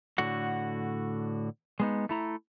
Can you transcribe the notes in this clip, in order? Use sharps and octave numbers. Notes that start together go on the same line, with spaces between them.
A2 D3 F#4 F#5
G#3 B3 D#4
A3 E4 A#5